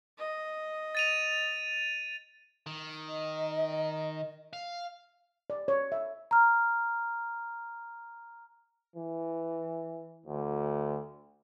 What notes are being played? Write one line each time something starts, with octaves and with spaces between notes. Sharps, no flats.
D#5
A6 D#7 F7
D#3
D#5
F5
D5
C#5
E5
A#5 F6
E3
D2